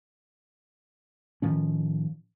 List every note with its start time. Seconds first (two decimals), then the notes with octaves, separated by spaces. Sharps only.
1.42 A2 D#3 F3 C#4